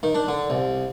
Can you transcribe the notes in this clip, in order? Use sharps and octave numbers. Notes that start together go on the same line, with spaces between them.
D#3
D4
D3
C2